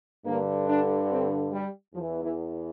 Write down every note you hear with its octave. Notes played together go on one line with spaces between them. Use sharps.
G2 D3 A#3
D4
C4
G3
E2 E3 F3
E3